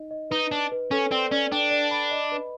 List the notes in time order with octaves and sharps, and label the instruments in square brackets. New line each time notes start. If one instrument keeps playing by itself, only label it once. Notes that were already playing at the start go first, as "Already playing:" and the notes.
Already playing: [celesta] D#4 D#5
D#5
[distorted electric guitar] D#4 [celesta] B4
[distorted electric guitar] D4 [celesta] B4
[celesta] B4
[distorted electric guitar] C#4 [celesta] A4
[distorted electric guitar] C4 [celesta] D5
[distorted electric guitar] C#4 [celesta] D5
[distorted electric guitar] D4 [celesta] G5
[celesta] D5
B5
D#5
B4